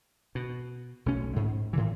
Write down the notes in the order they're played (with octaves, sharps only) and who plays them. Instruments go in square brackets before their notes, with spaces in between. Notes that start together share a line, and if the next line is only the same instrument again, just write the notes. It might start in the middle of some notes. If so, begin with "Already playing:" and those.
[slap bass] B2
B1 A3 C#4
G#2
A2 D3 E3